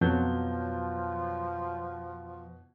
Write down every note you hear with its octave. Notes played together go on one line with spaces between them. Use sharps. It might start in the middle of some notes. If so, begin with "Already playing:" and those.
F2 B2 F3 F#3 A5 G6